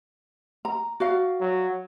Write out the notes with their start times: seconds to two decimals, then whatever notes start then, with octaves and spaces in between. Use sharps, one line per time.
0.65 A#5
1.00 F#4 D5 F5
1.40 F#3